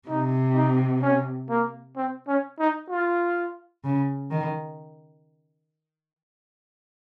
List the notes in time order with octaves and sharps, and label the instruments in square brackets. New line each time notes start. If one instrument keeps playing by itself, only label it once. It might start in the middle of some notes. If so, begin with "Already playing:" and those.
[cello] C3 [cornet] D#4
[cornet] D#4
C#4
A#3
C4
C#4
D#4
F4
[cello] C#3
D#3